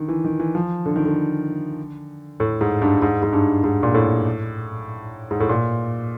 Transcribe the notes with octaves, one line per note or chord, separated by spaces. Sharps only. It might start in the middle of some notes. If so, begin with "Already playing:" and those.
Already playing: D3 D#3
E3
D#3
E3
F3
D3
D#3
D3
A2
G#2
G2
G#2
G#2
G2
G#2
A#2
A2
G#2
A2
A#2